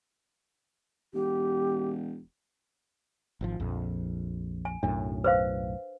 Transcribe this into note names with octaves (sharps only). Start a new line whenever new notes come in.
E1 G4
G#1 B2 F3
A#1 F2
G#5
B1 F#2 A2 D4
B4 C5 F5